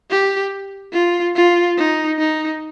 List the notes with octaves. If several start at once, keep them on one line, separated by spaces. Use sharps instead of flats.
G4
F4
F4
D#4
D#4